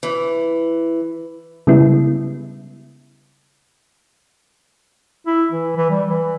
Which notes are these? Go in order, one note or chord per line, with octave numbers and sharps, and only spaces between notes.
E3
C#3 G3 G#3 B3 E4
E4
E3
E3
G3
E3